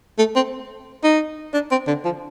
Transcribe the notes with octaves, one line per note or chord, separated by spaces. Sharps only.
A3
C4
D#4
D4
C4
D3
F3